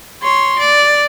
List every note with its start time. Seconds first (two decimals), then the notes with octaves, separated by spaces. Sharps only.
0.23 C#5 C6
0.59 D5